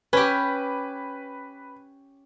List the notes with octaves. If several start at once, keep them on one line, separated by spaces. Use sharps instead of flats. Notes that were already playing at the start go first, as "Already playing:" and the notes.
C#4 G4 B4